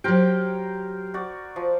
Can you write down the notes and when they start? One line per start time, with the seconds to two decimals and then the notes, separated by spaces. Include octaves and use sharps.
0.04 F#3 G4 A#4 C5 G5
1.14 F#4 D5
1.56 F3